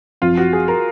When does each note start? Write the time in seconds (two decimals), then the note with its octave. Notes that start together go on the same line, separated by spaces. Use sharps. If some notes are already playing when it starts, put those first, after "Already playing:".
0.22 G#1 F#2 F3 C4 F4
0.37 F#4
0.53 G#4
0.68 A#4